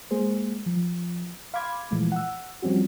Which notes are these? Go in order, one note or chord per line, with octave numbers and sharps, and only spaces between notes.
G#3 A#3 G#4 C5
F3
F5 B5 C6 D6 G#6
A#2 E3 F3 G#3 A3
F#5 E6
F3 G3 C4 C#4 F#4